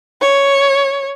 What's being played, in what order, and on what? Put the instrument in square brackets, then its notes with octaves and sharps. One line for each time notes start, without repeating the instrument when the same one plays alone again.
[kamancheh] C#5